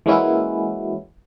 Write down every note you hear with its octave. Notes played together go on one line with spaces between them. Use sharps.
E3 G#3 A#3 C#4 E4 F#4